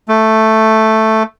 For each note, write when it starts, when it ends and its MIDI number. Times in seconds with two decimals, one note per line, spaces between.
0.08 1.23 57